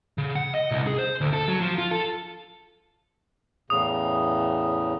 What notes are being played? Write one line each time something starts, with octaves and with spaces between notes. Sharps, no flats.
C#3
F#5
D#5
C2
G#4
C5
D2
A4
F#3
F3
F4
A4
E2 A2 C#3 D#6